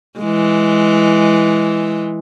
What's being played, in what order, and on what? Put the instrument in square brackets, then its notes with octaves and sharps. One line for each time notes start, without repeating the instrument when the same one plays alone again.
[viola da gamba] E3 G#3